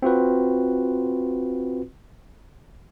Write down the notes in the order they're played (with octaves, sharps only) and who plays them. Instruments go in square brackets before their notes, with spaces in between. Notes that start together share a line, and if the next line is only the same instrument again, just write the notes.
[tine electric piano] C4 F4 F#4 B4